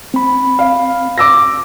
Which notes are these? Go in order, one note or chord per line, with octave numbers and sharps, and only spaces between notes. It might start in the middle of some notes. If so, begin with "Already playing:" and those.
C4 B5
F5
D6 E6 A#6